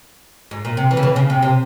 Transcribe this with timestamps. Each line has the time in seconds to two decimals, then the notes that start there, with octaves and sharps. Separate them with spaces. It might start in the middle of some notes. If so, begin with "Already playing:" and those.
0.51 G#2
0.65 A#2
0.77 C3
0.91 E3
0.97 C#3
1.03 E3
1.16 C#3
1.30 C3
1.42 C3